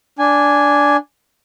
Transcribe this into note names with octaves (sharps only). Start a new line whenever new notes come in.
D4 G#5